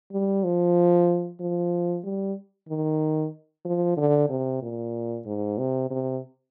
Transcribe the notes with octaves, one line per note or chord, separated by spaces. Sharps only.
G3
F3
F3
G3
D#3
F3
D3
C3
A#2
G#2
C3
C3